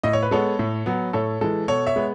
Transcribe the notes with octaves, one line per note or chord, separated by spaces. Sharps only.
A2 D#5
C#5
B4
G#3 B3 A4 C#5
A2
F#3 B3
A2 A4 C#5
E3 G#3 A4
B2 A4 C#5
C#5 E5
G#3 B3